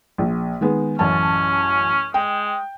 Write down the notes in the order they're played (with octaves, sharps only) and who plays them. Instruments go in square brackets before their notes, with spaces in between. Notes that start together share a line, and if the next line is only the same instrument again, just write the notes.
[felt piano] A#1
D#3 G#3 B3
[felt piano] A1 F#2 A5 [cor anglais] C#4
[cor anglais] G#3 [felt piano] G5